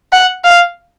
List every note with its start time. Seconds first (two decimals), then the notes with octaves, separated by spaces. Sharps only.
0.12 F#5
0.44 F5